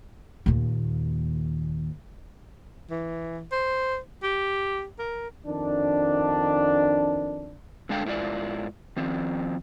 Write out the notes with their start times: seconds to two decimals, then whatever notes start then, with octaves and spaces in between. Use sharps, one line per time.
0.46 D#2 A#2
2.90 E3
3.52 C5
4.23 G4
4.99 A#4
5.46 F2 D#3 D4
7.89 D3 G#3 D4 A4 F5 G5
8.05 G#2 E4 F4 G#4 D5
8.96 D#3 F3 C4